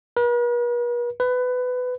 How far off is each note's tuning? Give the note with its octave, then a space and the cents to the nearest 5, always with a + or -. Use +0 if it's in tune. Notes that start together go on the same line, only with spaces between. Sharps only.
B4 -45
B4 +20